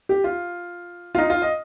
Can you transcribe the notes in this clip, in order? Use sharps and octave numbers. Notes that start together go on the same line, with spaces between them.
G4
F4
F4
D#4
F4
D#5